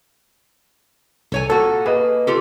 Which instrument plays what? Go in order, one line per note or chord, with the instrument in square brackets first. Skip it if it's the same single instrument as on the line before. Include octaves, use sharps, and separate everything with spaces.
[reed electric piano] C2 [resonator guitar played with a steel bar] A4 C#5 G#5
[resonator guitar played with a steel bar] A#2 F#4 [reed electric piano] A4
[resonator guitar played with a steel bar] A#3 [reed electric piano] G#4 B4 D#5
[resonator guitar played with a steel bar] F4 G4 A4